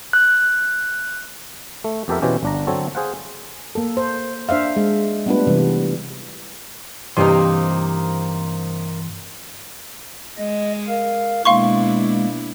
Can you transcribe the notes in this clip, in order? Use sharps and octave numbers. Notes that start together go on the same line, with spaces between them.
F#6
A3
F2 B3 G4 A4 A#4 E5
B2 E3 C4 C#4 G4
G1 D4 A#5
D3 F#3 C4 A4 C#5
G#4 C5 F5 F#5
A#3 A4
C5
D4 C5 E5 F5
G#3
G3 A3 B3 D4 F4 B4
C3 E3 G3
G2 C3 E3 A#3 D#4 C6
G#3 D#5
A#4 F5
B2 G#3 A#3 D4 E4 F5 C6 C#6